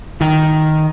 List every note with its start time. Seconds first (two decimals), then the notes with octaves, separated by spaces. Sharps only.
0.21 D#3